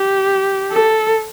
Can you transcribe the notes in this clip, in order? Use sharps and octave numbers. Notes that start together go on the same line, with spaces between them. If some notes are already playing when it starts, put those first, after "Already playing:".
Already playing: G4
A4